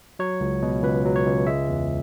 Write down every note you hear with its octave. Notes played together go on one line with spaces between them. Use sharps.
F#3 C#5
C#2
B2
C#2 B4
F#3
C#5
C#2
G#3 E5
E2